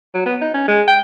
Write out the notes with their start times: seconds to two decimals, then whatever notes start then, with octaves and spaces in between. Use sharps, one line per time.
0.14 F#3
0.26 B3
0.41 D#4
0.54 C#4
0.68 G#3
0.88 G5